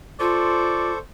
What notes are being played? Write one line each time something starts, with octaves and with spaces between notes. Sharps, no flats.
F4 A4 C5 D5 C#6